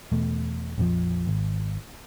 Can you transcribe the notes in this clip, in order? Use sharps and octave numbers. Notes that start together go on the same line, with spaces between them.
E2 B2 A3
A#1 F2 C#3 F3
G#1